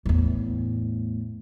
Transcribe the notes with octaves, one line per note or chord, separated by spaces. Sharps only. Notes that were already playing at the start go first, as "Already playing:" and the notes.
E2 A2